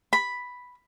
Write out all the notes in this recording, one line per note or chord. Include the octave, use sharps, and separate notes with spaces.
B5